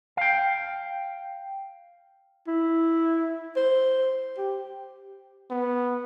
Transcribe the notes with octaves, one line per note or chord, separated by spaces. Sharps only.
F5 G5
E4
C5
G4
B3